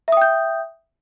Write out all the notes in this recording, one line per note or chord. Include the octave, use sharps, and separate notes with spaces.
E5 G5 D#6 G6